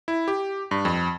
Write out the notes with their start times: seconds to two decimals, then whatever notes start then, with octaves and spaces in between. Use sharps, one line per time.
0.08 E4
0.28 G4
0.71 G2
0.85 F2